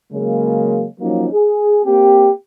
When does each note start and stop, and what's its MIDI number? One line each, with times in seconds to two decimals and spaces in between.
0.13 0.85 49
0.13 0.85 54
0.13 0.85 56
0.13 0.85 58
1.00 1.27 53
1.00 1.27 54
1.00 1.27 58
1.00 1.27 61
1.00 1.27 63
1.33 1.80 68
1.85 2.29 58
1.85 2.29 60
1.85 2.29 67